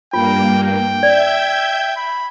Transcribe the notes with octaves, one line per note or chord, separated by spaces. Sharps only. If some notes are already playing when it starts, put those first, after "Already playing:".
G2 A#3 F4 G5
G5
D5 E5 G6 G#6
B5